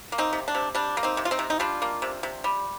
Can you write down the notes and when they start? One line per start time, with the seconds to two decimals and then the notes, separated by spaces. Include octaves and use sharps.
0.12 A#3
0.18 C4 D#4
0.33 C3
0.48 D4
0.55 C3
0.75 G3 D4
0.97 A#3
1.03 C4 D#4
1.17 C3
1.25 F4
1.31 C4 D#4
1.39 C3
1.50 D#4
1.59 G3 D4 F4
1.82 A#3
2.02 C3
2.23 C3
2.44 G3